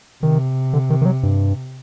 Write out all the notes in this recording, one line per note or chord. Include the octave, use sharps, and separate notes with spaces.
C3 D#3
D3
D#3
D#3
F#3
G2